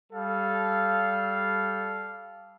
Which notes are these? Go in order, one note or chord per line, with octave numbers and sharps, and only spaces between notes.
G3 A4 F5